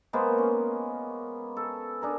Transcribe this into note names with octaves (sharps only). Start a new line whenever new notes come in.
G#3 A#3 B3 C5
C#4
A4
D4 G#4 A#4